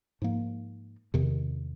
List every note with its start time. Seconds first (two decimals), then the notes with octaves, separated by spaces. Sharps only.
0.22 G#2 F3 A#3
1.14 E2 C3 D#3